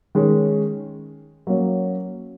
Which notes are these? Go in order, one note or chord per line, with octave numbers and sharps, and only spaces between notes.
D#3 G#3 C#4
F#3 A#3 C#4